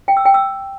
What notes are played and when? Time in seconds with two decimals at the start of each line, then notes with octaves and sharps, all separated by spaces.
0.08 G5
0.17 E6
0.25 G5
0.34 E6